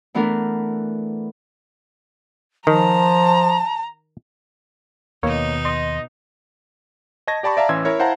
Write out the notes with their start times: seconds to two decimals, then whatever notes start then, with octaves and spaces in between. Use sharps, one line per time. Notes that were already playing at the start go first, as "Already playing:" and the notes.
0.14 E3 A3 B3 D4 E4 A#4
2.67 D#3 F3 A5 A#5
5.23 D#2 B2 A#3 D#4 C#5
5.65 D#5 C6 D#6
7.27 D#5 A5 C#6 G#6 A#6
7.43 G4 D5 A5 B5 C#6
7.57 D5 E5 F5 A5 A#5
7.69 A1 E3 C#4 C6 E6 G#6
7.85 E4 A#4 C#5
7.99 E4 C5 F5 F#5 A5 A#5